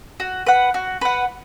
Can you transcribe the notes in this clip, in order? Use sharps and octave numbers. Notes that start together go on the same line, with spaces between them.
F#4
B4 F#5
F#4
B4 F#5